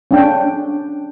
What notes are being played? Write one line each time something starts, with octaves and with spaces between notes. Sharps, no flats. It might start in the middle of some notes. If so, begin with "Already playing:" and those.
C#4 D4 G5